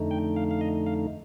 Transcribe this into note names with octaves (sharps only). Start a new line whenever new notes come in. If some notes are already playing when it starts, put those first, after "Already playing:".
Already playing: F2 D3 A3 D#4
G5
F5
F5
D#5
F5